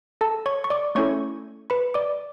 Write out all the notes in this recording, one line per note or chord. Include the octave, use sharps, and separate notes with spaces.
A4 A5
C#5 C#6
C#6
D5 D6
A3 C#4 E4 A4 C#5 C#6
B4 B5
D5 D6